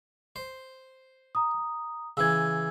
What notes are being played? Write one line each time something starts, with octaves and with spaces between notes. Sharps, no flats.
C5
A#5 D#6
C#3 E3 E6 G#6